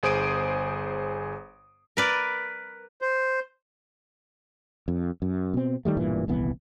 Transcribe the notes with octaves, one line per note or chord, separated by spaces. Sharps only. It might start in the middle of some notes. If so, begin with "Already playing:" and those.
G1 G#4 C5 D#6 D7 D#7
A#4 B4 D5
C5
F2
F#2
B2 C4
D#3 G3 A3
E1 G2 A#2 E3
D#1 C2 E3 B3